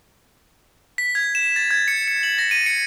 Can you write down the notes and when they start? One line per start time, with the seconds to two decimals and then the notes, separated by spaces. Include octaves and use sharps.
0.98 B6
1.15 G#6
1.35 E7
1.56 A6
1.71 G#6
1.88 C#7
2.08 C#7
2.23 F#7
2.39 A#6
2.51 D#7
2.66 C#7